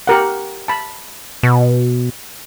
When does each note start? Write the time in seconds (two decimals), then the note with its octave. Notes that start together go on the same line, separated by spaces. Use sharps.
0.07 G4 A#4 F#5
0.68 A5 B5
1.43 B2